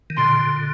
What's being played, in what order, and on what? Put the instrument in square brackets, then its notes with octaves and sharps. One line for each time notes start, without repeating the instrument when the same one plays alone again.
[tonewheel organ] D#3
[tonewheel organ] A#2 D3 [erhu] C6